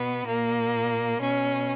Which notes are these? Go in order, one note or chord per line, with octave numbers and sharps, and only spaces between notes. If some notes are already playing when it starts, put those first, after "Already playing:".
Already playing: B2 B3
A#2 A#3
B2 C#4